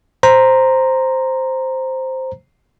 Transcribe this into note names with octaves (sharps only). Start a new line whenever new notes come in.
C5 A#5